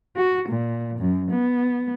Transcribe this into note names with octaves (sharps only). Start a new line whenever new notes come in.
F#4
A#2
F#2
B3